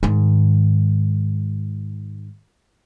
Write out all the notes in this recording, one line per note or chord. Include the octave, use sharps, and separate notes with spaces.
G#2 D#3